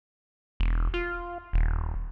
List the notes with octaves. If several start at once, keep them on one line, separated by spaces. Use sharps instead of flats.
E1
F4
D#1